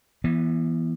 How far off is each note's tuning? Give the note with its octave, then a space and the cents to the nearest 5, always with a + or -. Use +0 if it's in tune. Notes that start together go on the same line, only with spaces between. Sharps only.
E3 +5 B3 -25